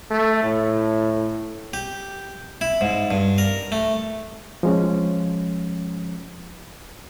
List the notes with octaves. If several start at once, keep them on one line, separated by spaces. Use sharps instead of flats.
A3
A2
G4
E4
G#2
G2
A#4
A3
F3 G#3 C#4